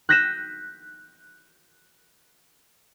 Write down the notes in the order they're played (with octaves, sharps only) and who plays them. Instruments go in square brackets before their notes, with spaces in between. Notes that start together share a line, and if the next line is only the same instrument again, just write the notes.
[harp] F#6 G6 A#6 B6 D#7 E7